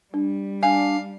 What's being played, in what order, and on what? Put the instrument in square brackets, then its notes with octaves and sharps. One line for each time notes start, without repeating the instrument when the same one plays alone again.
[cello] G3 [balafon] D4
[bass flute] D4 [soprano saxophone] F5 [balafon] G#5